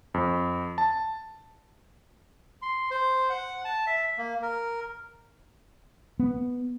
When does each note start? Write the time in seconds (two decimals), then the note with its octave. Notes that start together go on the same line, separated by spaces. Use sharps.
0.14 F2
0.78 A5
2.62 C6
2.91 C5
3.30 F#5
3.65 A5
3.87 E5
4.18 A#3
4.42 A#4
6.19 B3